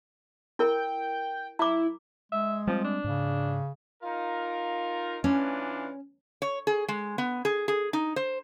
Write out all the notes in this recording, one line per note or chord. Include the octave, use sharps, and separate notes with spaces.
E4 A#4 G5
E4 A#5 D6
G#3 E5
F3 G3 C4
D4
G#2 C#3
D#4 F4 A#4
E3 C#4 D4 F4
C#5
G#4
G#3
B3
G#4
G#4
D#4
C5